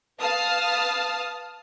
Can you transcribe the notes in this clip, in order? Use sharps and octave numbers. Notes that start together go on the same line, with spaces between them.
B4 F5 A5 D#6 F6